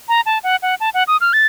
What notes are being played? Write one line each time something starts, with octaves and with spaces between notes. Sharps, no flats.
A#5
A5
F#5
F#5
A5
F#5
D#6
F6
A6